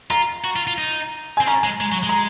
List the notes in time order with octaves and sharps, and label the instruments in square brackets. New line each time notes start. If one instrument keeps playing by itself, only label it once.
[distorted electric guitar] F4 [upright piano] A#5
[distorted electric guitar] F#4
F4
F4
D#4
[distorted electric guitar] C4 [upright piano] G#5
[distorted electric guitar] C#4 [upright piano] A#5
[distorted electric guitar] G#3
G#3
F#3
G#3
[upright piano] A#5